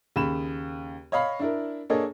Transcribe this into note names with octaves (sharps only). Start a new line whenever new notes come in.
D#2 C#3 B5 E7
C#5 D#5 F5 B5
D4 E4 A#4
A#3 D4 G#4 A4 C#5 D#5